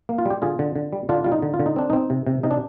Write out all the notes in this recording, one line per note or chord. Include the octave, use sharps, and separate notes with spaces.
A#3
F4
G3 G4
D3 F4 G#4
D3
D3
G3
D3 D4 F4
G3 F4
D#4
D3
F4
D3
D#4
C4 D4
C4 D#4
C3
C3
C3 D#4
D4